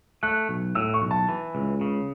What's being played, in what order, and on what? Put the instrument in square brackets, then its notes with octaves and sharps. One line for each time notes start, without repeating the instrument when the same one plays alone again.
[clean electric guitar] A3 [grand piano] F#6
[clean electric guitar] B1
[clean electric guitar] A2 [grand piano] E6
[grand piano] C#6
[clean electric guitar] B1
[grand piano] A5
[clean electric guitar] E3
C#2
C#3